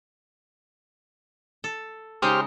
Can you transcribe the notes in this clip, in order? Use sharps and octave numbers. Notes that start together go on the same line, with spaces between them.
A4
C#3 G#3 D#4 G4 C5 F6